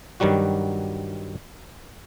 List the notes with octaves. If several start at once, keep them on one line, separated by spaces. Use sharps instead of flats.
G2 D#3 F#3 G3 F#4